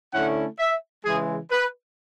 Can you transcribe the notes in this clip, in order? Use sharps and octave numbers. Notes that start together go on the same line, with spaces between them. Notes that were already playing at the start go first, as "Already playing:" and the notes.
D3 A3 C#4 E4 F#5
E5
C#3 E3 G#3 G#4
B4